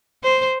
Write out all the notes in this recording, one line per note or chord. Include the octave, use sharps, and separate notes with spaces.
C5